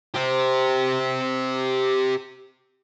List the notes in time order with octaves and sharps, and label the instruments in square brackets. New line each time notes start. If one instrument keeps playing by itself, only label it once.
[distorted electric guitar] G4 C5